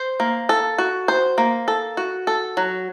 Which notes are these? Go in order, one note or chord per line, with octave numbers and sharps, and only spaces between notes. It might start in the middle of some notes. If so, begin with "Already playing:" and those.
Already playing: C5
A#3
A4
F#4
C5
A#3
A4
F#4
A4
F#3